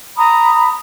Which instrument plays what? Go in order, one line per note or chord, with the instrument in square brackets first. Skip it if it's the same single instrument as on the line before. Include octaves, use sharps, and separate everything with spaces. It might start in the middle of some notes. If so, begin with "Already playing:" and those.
[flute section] A#5 B5 D#6